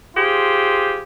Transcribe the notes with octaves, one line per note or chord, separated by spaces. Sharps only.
F4 G4 G#4 C5